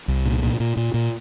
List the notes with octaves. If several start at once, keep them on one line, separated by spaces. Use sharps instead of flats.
C2
A#2
A#2
A#2
A#2
A#2